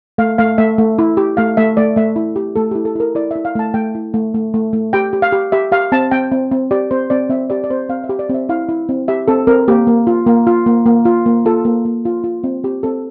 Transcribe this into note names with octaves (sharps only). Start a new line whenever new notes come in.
A3 F5
A3 F5
A3 E5
A3
E4
G4
A3 F5
A3 E5
A3 D5
A3 E5
E4
G4
A3 A4
E4 G4
A4
E4 A#4
E4 D5
E4 E5
F5
A3 A5
A3 G5
E4
A3
A3
A3
A3
G4 G5
G4
F5
G4
G4 E5
G4 F5
C4 A5
C4 G5
C4
C4
G4 D5
C4 C5
C4 D5
C4 E5
G4 D5
D5
C4 C5
C4 F5
E5
G4
D5
C4
E5
E4 F5
E4
C4
G4 E5
C4 A4
C4 A#4
A#3 G4
A#3
F4
A#3
F4
A#3
A#3
F4
A#3
F4 A4
A#3
A#3
F4
F4
C4
C4 G4
C4 A4